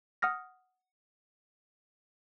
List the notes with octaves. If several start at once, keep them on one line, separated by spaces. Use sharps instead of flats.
F#5 D#6 F6 A#6